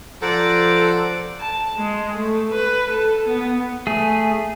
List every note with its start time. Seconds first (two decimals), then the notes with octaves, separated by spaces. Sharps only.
0.22 F3 A4 C5 D5 F#5 A#5
1.40 A5
1.77 G#3
2.17 A3
2.53 B4
2.90 A4
3.28 B3
3.87 A3 G#4